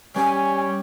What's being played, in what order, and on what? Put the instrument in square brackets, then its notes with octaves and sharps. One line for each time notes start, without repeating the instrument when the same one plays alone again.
[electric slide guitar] G3 G4 [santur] C#4 [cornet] C#5 [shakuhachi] G#5